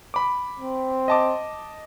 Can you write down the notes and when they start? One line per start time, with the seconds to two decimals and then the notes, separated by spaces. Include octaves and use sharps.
0.14 B5 D6
0.60 C4
1.08 D#5 A5 D6